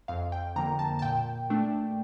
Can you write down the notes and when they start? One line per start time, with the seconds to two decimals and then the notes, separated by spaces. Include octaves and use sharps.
0.08 F2 F5
0.32 G5
0.56 D3 F3 A#3 A#5
0.79 A5
0.99 A5
1.02 A#2 G5
1.50 A3 D4